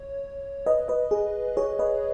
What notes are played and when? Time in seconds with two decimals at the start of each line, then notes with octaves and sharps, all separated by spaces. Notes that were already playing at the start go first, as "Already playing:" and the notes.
Already playing: C#5
0.66 B4 D#5
0.88 B4 D#5
1.11 G#4
1.57 G#4 C#5
1.79 B4 D#5